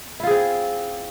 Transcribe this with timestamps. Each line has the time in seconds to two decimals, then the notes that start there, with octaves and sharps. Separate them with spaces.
0.20 E4
0.23 F4
0.27 G#4
0.31 C4